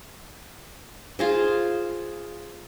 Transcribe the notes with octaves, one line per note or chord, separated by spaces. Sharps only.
F4 G#4 C5